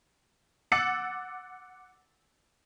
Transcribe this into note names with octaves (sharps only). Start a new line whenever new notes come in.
F#5 D6 E6 A6 C#7 F#7